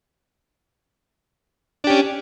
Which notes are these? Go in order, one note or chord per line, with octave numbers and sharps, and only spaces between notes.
C#4 D4 G4